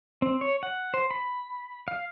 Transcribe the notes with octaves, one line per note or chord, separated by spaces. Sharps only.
C4
C#5
F#5
C5
B5
F5